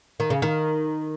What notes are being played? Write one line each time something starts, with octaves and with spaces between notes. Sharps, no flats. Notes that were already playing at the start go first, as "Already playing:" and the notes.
D#3
C#3
D#3